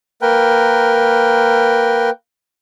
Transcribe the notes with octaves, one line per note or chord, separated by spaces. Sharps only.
A#3 A#4 B4 G5